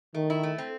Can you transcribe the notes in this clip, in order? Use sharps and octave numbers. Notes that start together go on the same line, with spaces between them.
D#3 A3
E4
A3
C4